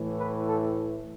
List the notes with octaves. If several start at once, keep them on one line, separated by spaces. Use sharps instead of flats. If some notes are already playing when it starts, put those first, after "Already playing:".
Already playing: A2 E3 A3
B4
A4